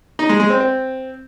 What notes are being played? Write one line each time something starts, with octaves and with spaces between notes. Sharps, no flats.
D#4
G#3
G#3
C4
C4